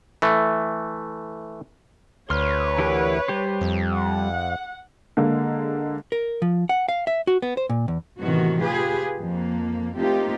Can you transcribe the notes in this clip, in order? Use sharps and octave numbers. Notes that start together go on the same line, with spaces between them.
E3 A3
D2 B4 C#5 C6 F6
E3 G4 A#4
G3 G4 C5
F2
F#5
D3 G#3 A#3
A#4
F3
F#5
F5
E5
F#4
B3
C5
A#2
E2
A2 C3 D#3 E3 B3 F#4
F4 G4 G#4 B4
F2 A#3
A3 A#3 C4 D#4 F4 G4